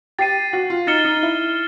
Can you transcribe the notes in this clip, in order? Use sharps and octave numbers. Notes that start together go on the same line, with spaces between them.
G4 A6 C7 D#7
F#4
F4
D#4 F6 A6 C#7 E7 G7
D#4
E4